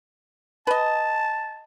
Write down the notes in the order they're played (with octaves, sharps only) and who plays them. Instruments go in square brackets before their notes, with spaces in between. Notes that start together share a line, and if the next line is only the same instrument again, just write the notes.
[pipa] B4 D#5 [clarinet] A5